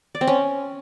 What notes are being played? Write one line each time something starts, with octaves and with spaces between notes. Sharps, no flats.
D5
C4
C#4